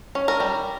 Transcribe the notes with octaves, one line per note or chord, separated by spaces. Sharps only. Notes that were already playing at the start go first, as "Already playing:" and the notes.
C#4
A#4
G3